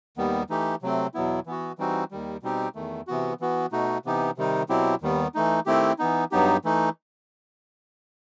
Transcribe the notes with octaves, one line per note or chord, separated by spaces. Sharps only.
D#2 D#3 G3 B3
E3 A3 D#4 G4
C3 F#3 A3 C4
E2 B2 F#3 B3 E4
E3 B3 F#4
E3 G3 C4 D#4 F#4
D#2 D#3 G3
B2 G3 C4 D#4 G4
E2 D#3 A3
C3 E3 B3 F#4
E3 B3 F#4
B2 A3 D#4 F#4
C3 E3 B3 D#4 G4
C3 D#3 G3 D#4
B2 F#3 C4 E4 G4
D#2 D#3 G3 B3
E3 A3 D#4
D#3 A3 C4 E4 G4
E3 B3 D#4
G2 F#3 B3 D#4 G4
E3 A3 D#4